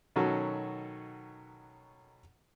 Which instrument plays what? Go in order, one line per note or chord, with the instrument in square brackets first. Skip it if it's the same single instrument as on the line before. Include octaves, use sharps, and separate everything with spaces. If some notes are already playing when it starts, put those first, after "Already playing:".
[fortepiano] B2 D#3 F#3 C#4 F#4 A4